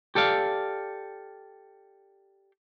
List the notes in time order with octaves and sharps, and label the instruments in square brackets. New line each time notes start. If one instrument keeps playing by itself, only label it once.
[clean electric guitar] G4 A4 D5 F5